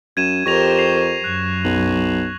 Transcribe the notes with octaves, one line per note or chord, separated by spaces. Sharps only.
F#2 G#6 D#7 E7
F2 G4 A#4 C5 C#6 A#6 F7
C7 F7
F#2 F#6
B1 F#7